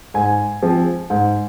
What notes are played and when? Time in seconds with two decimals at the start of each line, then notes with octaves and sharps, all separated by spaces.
0.14 G#2 G#5
0.62 F3 G#3 C4
1.10 G#2